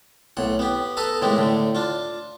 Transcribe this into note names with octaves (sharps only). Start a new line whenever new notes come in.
B1 A2 F#5
B3 G4
A4 B4 D#5 A#5
A2 D#3 G#3 B3 G4
A2 D3
D4 F4